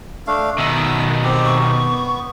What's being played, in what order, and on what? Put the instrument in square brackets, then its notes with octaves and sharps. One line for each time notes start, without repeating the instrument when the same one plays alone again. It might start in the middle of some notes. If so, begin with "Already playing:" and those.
[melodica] A3 D4 F5
[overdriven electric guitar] B2 D#3 [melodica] E5 E6
[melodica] C4 G4
[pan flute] C#6
[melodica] B3